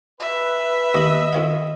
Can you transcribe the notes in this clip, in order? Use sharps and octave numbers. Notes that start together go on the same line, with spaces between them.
B4 E5
D#2 D#5 B5
F2 D#3 F5